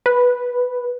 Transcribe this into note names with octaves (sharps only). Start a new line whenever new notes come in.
B4